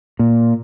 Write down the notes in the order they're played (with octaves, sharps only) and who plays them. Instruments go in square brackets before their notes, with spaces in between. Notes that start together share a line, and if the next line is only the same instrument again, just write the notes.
[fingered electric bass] A#2